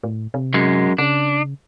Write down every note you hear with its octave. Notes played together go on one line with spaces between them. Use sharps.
A2
C3
F#2 G#3
C#3 D4